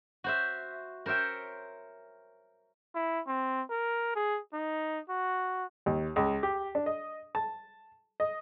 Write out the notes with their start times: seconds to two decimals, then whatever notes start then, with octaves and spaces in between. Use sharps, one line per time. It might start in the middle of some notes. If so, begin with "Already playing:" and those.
0.24 F#4 C5 E5
1.06 A#4 C5 C#5 E5 G5
2.95 E4
3.27 C4
3.70 A#4
4.16 G#4
4.53 D#4
5.09 F#4
5.86 D#2
6.16 C#2
6.43 G4
6.75 D4
6.86 D#5
7.35 A5
8.20 D#5